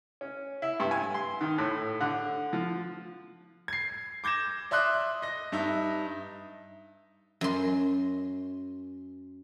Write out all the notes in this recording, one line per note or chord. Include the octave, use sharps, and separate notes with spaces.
C#4
E4
G2
G#5
C6
D#3
A2
D3
F3
G#6 C7
D6 G6 G#6 A#6 E7
D5 E5 C6 D#6 F#6
D#5 A#6
G2 D#4 E5
F#2 C6